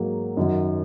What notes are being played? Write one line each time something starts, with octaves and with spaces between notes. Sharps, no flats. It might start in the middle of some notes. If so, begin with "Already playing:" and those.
Already playing: G#2 F#3 A#3
F#2 D#3 F#3